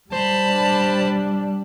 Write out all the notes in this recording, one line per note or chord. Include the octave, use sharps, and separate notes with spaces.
G3 C5 A5 B5
D4